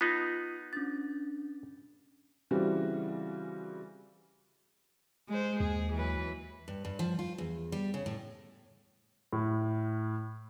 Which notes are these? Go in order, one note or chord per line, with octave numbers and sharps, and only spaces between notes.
B3 D#4 F4
C#4 D4 A6
C#3 E3 G3 C4 F#4 G4
G#3 C5
D#2 G#4
E3 F#3 B4
G2
G2
F3
F4
E2
G3
C#3
A2
A2